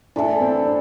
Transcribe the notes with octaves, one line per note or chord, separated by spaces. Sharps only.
E3 A3 D4 E4 A4
C4
D4